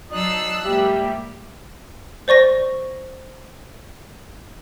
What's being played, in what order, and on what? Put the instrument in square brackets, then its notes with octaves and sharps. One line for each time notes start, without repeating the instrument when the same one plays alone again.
[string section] F#3 A5 C7 [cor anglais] D#4 [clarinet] D5 [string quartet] E6 F#6
[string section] G#2 G3 A#3 [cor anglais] G4 [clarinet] E5
[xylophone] C5 D5 C#6 A#6